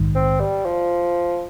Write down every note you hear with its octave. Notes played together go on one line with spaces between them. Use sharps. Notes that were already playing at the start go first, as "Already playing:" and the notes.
Already playing: A#1 G#2 D#3
C4
G3
F3